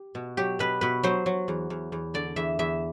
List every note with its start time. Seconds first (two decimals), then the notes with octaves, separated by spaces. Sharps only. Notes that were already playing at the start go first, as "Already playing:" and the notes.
Already playing: G4
0.15 B2
0.37 F#3 G4
0.59 B2 B4
0.81 B2 B4
1.03 F#3 C5
1.26 F#3
1.48 E2
1.70 E2
1.92 E2
2.14 D3 D5
2.36 E2 E5
2.59 E2 E5